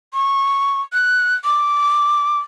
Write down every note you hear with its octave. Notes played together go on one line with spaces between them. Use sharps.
C#6
F#6
D6